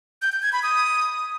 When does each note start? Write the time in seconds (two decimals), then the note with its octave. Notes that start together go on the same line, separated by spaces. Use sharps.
0.22 G6
0.32 G6
0.42 G#6
0.53 B5
0.63 D#6